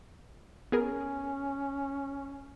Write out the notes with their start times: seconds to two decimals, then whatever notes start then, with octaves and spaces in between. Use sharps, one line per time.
0.72 B3 C#4 G#4 A#4